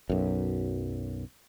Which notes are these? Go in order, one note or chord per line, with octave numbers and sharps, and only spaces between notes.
B1 F#2